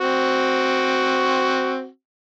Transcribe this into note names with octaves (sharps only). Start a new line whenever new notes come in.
C4 F#4